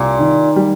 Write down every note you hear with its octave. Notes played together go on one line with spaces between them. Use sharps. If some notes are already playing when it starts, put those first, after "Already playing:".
Already playing: C2 A#2
D#3
G3